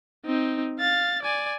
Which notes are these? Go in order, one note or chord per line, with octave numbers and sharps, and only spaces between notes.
C4 D#4
F5 A6
D5 G#5